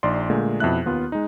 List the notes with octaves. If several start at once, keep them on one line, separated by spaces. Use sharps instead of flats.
A#1 D#4 D5 C6
A#2 D3 G#3 A3
F2 B2 E4 E5 F#6
D#2 B3 F4
G#3 D#4